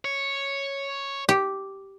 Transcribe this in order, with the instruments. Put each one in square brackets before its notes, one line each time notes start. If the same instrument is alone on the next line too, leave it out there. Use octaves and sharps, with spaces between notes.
[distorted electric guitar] C#5
[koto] G4